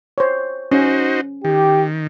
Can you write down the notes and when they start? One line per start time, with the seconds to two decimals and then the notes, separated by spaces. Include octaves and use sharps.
0.18 C5 C#5
0.71 C#4 D#4 F#4 C5
1.44 D#3 G4